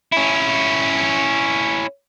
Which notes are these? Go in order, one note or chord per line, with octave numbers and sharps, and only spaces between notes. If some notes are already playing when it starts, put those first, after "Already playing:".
C#4 E4